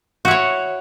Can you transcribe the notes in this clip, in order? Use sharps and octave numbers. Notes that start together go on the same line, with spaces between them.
E4 F#4 C#5